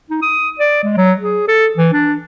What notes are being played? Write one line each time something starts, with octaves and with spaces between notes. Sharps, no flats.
D#4
D#6
D5
G#3
F#3
G#4
A4
E3
D4